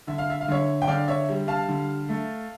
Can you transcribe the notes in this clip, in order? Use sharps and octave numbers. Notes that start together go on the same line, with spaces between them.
D3 E5
F5
E5
F5
D3 C#5 E5
G5
D3 D5 F5
C#5 E5
G3
F5 A5
D3
A3